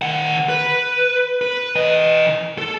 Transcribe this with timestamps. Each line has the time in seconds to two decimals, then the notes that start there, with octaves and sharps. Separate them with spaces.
0.02 D#3 F#5
0.49 B4
1.42 B4
1.75 E3 D#5
2.58 A4